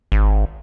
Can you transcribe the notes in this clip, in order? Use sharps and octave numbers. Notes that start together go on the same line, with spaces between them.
G#1